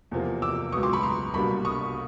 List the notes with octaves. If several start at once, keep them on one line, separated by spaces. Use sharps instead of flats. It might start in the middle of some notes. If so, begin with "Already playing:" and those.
E2 C3 F3 A#3
D6 E6
C#2 B2 F#3 B3 C#6 D#6
C6 D6
B5 C#6
A#5 C6
C2 B2 G3 A#3 D4 B5 C#6
C#6 D#6